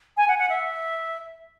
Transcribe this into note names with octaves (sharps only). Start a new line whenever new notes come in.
G#5
F#5
F#5
E5